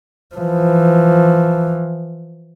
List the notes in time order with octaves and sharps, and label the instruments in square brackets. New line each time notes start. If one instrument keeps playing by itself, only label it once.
[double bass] E3 F3